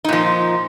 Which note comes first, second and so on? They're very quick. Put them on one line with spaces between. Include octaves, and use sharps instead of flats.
D#4 A#2 F3